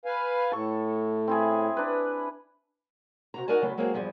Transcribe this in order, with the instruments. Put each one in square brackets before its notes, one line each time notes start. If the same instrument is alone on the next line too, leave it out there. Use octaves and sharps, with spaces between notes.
[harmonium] B4 F5 G#5
[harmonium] A2 [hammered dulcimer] A4 C#6
[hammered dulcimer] C4 E4 G#4
D4 B4
[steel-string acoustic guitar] C3 F#4 A#5
D#4 F#4 A#4 D5 G#5 A5
C#3 E3 F#3 A3 B3
F#3 G#3 A#3 C4 F#4 G#4
E2 G2 F3 G#4